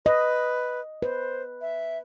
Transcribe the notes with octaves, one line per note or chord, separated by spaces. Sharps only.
B4 D#5
B4 C5
E5